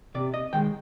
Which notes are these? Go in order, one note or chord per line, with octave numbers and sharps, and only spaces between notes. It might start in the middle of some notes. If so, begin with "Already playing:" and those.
C3 D5
D#5
D#3 G#3 G5